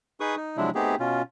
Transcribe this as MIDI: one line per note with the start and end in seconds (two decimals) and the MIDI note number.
0.20 0.36 63
0.20 0.36 68
0.20 0.36 71
0.20 0.36 85
0.20 0.36 87
0.37 0.57 63
0.57 0.70 48
0.57 0.70 53
0.57 0.70 54
0.57 0.70 56
0.57 0.70 62
0.57 0.70 64
0.75 0.95 57
0.75 0.95 59
0.75 0.95 60
0.75 0.95 63
0.75 0.95 67
0.75 0.95 68
1.00 1.22 47
1.00 1.22 61
1.00 1.22 65